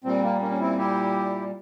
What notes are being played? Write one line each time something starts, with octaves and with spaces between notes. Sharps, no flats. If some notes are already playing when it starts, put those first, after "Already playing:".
A#2 G3 C4
A#3
A#3 C#4
C#4
C4 E4
E4 G4